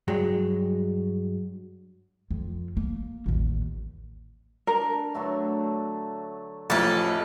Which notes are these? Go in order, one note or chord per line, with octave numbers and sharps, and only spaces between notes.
G2 F#3 G#3
F2
A#3
A1 D#2
D4 A#4
D3 F#3 A3
A1 F2 D#4 E4 A4